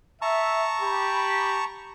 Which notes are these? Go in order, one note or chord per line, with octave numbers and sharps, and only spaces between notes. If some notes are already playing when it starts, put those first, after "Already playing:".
E5 A5 A#5 C#6
G4 B5